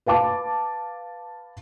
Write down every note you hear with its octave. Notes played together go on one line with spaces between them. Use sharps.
B4 F5 A5 D6